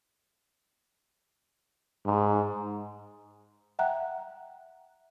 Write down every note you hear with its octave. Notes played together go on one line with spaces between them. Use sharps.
G#2
E5 F#5 G5 A#5 F#6